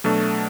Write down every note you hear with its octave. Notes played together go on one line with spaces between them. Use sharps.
B2 F#3 A3 D4 A4